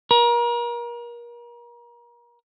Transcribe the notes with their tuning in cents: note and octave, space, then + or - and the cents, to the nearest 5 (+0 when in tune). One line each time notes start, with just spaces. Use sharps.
A#4 +35